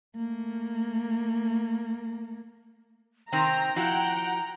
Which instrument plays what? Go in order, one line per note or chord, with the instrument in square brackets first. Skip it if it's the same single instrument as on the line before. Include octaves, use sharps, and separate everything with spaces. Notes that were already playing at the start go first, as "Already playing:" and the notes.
[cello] A3 A#3
[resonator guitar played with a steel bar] C3 D#3 C4 [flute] G5 [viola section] A#5
[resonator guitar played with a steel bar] F3 E4 F#4 [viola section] F#5 G5 [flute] A#5